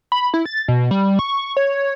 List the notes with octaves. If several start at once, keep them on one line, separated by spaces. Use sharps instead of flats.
B5
E4
A6
B2
G3
C#6
C#5